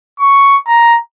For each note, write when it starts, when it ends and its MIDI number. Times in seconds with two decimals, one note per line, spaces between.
0.19 0.57 85
0.68 0.98 82